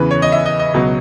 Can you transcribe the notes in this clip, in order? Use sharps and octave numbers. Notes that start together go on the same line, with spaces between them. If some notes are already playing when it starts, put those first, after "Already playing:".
Already playing: E2 C#3 E3 B4
C#5
D#5
E5
D#5
D#5
C#2 B2 F#3